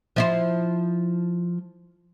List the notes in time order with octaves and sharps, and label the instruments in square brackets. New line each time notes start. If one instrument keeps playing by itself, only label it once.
[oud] F3 E4 C5